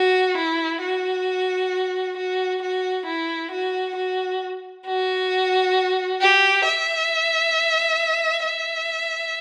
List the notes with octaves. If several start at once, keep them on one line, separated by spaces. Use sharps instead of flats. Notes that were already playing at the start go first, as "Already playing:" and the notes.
Already playing: F#4
E4
F#4
F#4
F#4
E4
F#4
F#4
F#4
G4
E5
E5